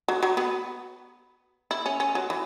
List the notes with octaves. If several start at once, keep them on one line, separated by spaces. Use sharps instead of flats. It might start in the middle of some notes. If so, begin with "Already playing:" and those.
F#3
F#3
B3
E4
C#4
C#4
F#3
E3